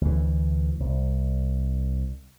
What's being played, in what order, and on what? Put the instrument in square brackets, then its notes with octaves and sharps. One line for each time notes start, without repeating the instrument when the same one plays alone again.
[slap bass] D2 E3
C2